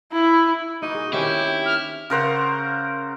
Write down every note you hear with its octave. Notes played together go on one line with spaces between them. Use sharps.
E4
A#3 D#4 F#4
G#4
D#3 C4 C#4 E4 G4
F6
C#3 A#4 C5 F#5